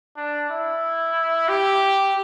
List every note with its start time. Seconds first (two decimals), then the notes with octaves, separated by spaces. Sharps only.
0.17 D4
0.50 E4
1.48 G4